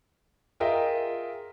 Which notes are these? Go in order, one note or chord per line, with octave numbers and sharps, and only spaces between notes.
F4 G#4 A#4 D#5 E5 G5